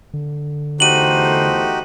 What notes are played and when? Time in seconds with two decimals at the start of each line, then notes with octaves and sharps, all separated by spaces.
0.14 D3
0.80 E2 A3 D#4 F#4 G4 C5 D#7 F#7